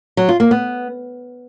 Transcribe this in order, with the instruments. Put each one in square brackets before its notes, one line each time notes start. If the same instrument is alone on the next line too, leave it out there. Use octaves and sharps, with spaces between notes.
[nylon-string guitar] F#3
F4
A#3
B3